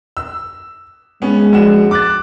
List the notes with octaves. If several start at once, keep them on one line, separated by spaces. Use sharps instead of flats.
E6
G#3 B3 C#4
A#1 F#4 E7
D6 F#6 A6